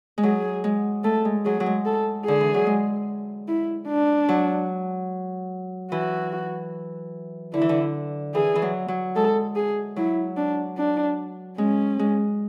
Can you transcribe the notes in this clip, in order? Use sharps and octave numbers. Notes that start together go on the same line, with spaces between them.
G#3
F#3 G#4
G#3
A3 A4
G#3
F#3 G#4
F#3
G#3
A4
D3 G#4
E3
F#3
G#3
E4
D4
F#3
E3 F#4
D3 E4
E3
D3
E3 G#4
E3
F#3
F#3
G#3 A4
G#4
F#3 E4
D4
D4
G#3 C#4
G#3